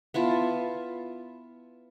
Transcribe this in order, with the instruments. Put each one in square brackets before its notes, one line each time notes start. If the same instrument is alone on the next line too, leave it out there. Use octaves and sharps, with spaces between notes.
[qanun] B3 E4 F4 A5